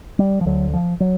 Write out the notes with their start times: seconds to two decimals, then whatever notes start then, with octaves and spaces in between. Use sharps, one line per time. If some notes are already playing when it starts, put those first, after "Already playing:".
0.19 G3
0.41 F3
0.46 D2 D3 F#3
0.74 F3
1.00 F#3